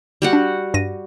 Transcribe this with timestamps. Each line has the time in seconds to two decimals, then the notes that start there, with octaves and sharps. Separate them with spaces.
0.22 G3 F#4 F#5
0.33 D4
0.74 G2 A#6 D#7